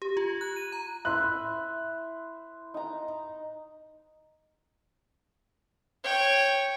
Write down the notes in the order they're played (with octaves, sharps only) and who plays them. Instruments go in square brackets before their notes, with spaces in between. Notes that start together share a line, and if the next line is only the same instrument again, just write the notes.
[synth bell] G4
F4
F#6
D#7
A#5
[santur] E4 C5 E5 [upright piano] F#6
[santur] D#4 A#5
[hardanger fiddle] C#5 G5